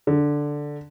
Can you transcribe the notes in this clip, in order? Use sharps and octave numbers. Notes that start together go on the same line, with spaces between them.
D3